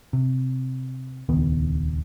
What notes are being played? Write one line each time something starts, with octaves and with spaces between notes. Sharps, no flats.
C3
D#1 C#2 D#3 B3